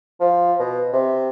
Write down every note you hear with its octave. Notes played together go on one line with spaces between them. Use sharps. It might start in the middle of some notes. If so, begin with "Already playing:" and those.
F3
B2
C3